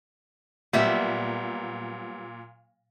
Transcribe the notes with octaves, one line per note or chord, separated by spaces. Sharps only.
A#2 F#3 G3 B3 E5